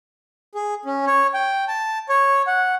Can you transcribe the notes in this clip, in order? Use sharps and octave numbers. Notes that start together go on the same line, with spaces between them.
G#4
C#4
C#5
G5
A5
C#5
F#5